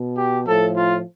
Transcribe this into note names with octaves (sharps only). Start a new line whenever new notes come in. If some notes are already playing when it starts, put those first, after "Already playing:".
Already playing: B2
G4
A2 F3 A4
F4